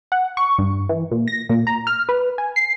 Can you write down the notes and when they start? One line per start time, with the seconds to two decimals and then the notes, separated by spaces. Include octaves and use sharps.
0.12 F#5
0.37 C#6
0.58 G2
0.89 E3
1.11 A#2
1.28 A#6
1.49 A#2
1.67 A#5
1.87 F6
2.09 B4
2.38 G#5
2.56 C7